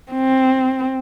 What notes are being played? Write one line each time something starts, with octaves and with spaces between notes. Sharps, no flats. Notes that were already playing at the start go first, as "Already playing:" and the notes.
C4